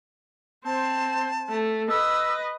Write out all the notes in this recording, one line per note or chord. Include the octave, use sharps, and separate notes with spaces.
C4 C5 A5
A3
B4 D#5 E6